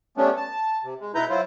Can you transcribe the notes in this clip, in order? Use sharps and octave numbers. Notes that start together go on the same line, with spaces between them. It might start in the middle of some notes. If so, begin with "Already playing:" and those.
G3 A3 B3 C#4 D4
A5
C3
G#3
B2 D#4 E4 B4 A#5 G6
F#3 E4 F4 C5